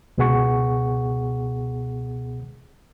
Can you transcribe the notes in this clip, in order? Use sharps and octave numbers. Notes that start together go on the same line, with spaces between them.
C#2 B2 B3 G#4 F#5 C#6